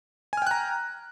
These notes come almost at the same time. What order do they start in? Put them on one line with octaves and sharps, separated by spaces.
G#5 F6 G5 F#6 A#5